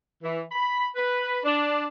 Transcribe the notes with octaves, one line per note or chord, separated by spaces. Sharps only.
E3
B5
B4
D4